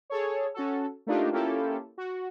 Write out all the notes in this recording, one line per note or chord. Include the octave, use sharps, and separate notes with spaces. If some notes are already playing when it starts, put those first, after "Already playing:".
G#4 A4 C#5
C#4 F#4 A4
A3 A#3 D4 D#4 F4 G4
A#3 C#4 E4 F4 G4 A4
F#4